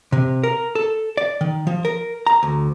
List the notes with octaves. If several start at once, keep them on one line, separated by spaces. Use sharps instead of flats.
C3
A#4
A4
D5
D#3
F3
A#4
A#5
D2